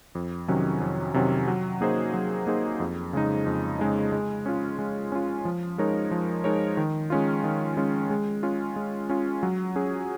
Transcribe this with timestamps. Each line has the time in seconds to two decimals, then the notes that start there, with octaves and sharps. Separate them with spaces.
0.15 F2
0.48 C3 D#3 F#3 C#4
0.81 F2
1.14 C3 D#3 F#3 C#4
1.48 F#3
1.81 A#3 D#4 G#4 C5
2.14 F#3
2.47 A#3 D#4 G#4 C5
2.80 F2
3.13 C#3 G#3 D#4
3.46 F2
3.79 C#3 G#3 D#4
4.12 G#3
4.46 C#4 F4
4.79 G#3
5.12 C#4 F4
5.45 F3
5.78 G#3 D#4 A#4 C#5
6.11 F3
6.44 G#3 D#4 A#4 C#5
6.77 D#3
7.10 G#3 C#4 F4
7.44 D#3
7.77 G#3 C#4 F4
8.10 G#3
8.43 C#4 F4
8.76 G#3
9.10 C#4 F4
9.43 F#3
9.76 C#4 G#4